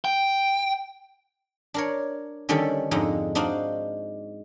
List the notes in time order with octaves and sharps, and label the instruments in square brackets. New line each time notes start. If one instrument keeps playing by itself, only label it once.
[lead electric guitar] G5
[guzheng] D4 A#4 C#5
D3 D#3 G3 C#4 G4 A4
F2 G#2 D3 D#4
D4 D#4 F#4 C5 F5